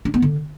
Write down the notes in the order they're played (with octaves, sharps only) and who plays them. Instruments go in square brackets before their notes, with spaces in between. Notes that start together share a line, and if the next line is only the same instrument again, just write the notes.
[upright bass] D4
B3
D3